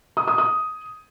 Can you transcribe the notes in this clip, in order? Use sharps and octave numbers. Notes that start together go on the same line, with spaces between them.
D#6
D#6
D#6